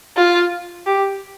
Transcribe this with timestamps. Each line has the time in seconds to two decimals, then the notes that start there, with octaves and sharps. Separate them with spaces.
0.17 F4
0.86 G4